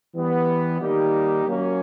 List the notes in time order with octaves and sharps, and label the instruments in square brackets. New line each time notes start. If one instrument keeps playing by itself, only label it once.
[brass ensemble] E3 G3 B3
D#3 G3 A#3 D#4 G4
F#3 A#3 C#4